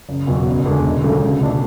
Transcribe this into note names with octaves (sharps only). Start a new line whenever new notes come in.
F#1
E2 B2 F#3
F#1
E2 D3 G#3
E1
D2 C#3 F#3 A3
C#2
B2 A3 D4 A4